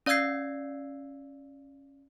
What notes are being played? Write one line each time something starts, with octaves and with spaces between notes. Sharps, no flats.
C#4 D5 F5 E6 G#6 C7